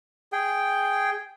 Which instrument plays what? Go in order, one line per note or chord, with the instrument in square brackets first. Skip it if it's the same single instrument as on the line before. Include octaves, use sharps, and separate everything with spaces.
[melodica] G#4 G5